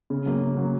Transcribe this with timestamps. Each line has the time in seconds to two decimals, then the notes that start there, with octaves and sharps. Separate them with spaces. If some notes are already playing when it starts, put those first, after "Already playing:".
0.10 C#3
0.26 F#3 A#3
0.41 C#3
0.57 F#3 A#3